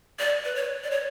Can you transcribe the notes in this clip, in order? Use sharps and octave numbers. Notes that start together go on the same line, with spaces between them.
D5
B4
C#5
D5
C#5